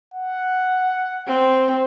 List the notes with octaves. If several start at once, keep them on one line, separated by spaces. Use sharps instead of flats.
F#5
C4